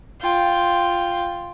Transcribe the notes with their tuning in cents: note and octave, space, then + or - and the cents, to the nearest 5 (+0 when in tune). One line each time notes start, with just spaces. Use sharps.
F4 +0 G5 +5